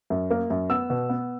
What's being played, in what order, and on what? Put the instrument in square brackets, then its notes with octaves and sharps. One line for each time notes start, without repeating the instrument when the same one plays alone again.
[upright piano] F#2
A#3
F#2
B3 E6
B2
B3